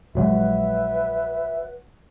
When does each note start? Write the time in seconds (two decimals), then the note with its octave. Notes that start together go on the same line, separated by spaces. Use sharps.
0.15 A#1 F#3 G#3 F#4 B4 C#5 E5 F#5